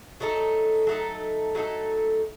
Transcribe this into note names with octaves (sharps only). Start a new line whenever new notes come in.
F#3 A3 D#4 A4
F#3 A3 D#4 A4
F#3 A3 D#4 A4